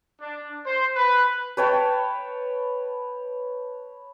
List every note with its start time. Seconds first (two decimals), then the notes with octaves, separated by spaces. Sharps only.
0.21 D4
0.66 C5
0.95 B4
1.57 B4 C#5 G5 A5